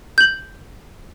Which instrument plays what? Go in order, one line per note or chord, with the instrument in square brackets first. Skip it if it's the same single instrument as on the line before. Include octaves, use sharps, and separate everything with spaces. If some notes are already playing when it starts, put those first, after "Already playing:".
[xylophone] G6 F#7